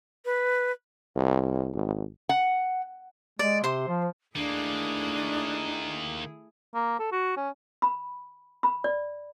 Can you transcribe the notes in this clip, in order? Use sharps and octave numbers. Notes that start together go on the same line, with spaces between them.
B4
C2
G#1
F#5
G#3 D5
C3 C5 C6
F3
D#3 A3 A#3 D4 E4 G#4
A#3
A4
F#4
C#4
B5
B5
D5